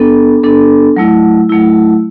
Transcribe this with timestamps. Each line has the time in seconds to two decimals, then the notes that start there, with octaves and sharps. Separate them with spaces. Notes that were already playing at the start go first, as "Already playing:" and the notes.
Already playing: B3 D4 A4
0.43 B3 D4 A4
0.96 F#3 A3 E4
1.49 F#3 A3 E4